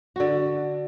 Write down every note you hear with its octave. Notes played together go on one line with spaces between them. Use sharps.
D3 F#4